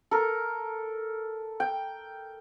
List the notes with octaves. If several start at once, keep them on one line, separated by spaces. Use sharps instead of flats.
A4 A#4
G5